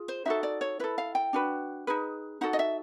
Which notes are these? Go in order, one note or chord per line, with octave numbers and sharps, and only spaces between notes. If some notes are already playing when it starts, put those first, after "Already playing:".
Already playing: F4 G#4
C5
D#4 F#4 A4 E5
D5
C#5
E4 A4 B4
F5
G5
D4 F#4 B4
D#4 G#4 B4
D#4 F#4 A4 F#5
D#5
E5